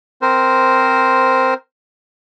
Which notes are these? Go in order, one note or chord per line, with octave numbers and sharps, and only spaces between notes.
C4 A#4 C5